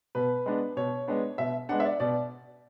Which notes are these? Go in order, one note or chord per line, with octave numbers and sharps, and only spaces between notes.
B2 B4
G#3 B3 D4
B2 C#5
G#3 B3 D4
B2 E5
G#3 B3 D4 F#5
E5
D5
B2 D5